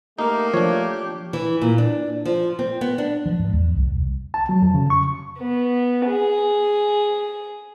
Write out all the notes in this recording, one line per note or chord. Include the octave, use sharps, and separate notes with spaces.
A3 A#3 D#4 G4
F3 D4 C#5
E3
A#2
D4
F3
C4
B3
D4
F3
G#2
E2
C2
A5
F#3
F2
C#3
C#6
B3
G#4